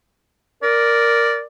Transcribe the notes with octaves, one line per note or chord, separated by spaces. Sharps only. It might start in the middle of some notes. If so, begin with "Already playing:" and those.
A#4 D5